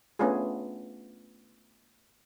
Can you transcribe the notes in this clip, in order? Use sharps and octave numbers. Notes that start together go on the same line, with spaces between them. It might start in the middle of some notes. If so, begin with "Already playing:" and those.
A3 B3 C#4 D4 F4 G#4